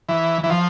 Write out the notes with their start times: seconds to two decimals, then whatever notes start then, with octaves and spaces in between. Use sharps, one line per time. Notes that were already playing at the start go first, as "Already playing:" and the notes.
0.09 E3
0.44 E3
0.50 F3